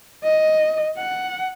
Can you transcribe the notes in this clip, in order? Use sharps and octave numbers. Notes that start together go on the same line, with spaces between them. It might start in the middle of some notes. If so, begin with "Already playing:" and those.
D#5
F#5